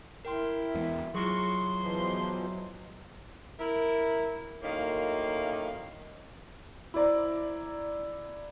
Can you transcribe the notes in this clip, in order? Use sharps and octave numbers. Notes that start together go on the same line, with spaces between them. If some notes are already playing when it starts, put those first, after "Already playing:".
E4 A#4 G5 C6
E2 G#3 B3
F#3 E4 F4 G#4 C6 C#6
B2 E3 F3
E4 A#4
F#2 A2 D#3 A#3 F5
E4 C5 D5 A#5